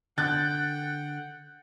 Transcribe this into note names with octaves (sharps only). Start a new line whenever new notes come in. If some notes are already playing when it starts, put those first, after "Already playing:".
D3 F#5 G5 F#6 G6 A6